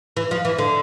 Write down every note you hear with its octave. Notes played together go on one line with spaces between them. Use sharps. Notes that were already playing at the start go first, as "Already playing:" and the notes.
E3
F3
E3
D3